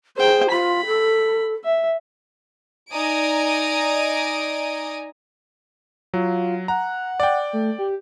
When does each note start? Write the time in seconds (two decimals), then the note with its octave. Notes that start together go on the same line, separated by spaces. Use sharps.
0.17 G#4 C5 G5
0.50 F4 B5
0.86 A4
1.64 E5
2.92 D#4 D5 G#5 A#5 D#6 D7
6.14 F#3 F4
6.68 F#5 A#5
7.20 D5 G5
7.53 A3
7.79 G4